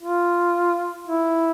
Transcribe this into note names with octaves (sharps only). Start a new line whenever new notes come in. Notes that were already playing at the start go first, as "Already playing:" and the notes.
F4
E4